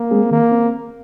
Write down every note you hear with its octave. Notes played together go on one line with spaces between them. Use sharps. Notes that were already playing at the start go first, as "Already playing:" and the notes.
Already playing: A#3
G#3 C4 G#4
D#3 A#3
C4